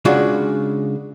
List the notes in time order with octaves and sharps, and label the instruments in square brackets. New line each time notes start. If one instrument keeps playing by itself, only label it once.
[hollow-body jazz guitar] C#3 G#3 D4 F4 F#4